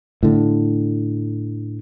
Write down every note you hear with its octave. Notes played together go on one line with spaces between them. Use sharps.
A2 D3